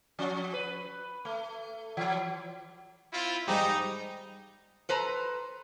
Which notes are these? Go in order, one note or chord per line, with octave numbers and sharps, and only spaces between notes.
F3 C#4
B4
A3
E3 F#3
C4 E4 F4
G#2 G3 D#4
A4 B4 C5 A#5